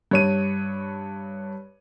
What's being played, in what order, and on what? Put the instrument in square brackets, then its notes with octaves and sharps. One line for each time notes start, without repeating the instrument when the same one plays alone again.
[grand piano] G2 C#5 D#7